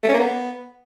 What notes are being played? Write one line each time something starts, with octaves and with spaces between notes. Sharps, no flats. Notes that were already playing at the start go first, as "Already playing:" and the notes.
A3
C#4
A#3
B3